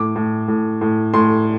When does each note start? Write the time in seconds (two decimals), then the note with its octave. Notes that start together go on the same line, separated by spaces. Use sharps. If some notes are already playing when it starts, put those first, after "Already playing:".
Already playing: A2 D6
0.16 A2
0.48 A2
0.81 A2
1.14 A2 C6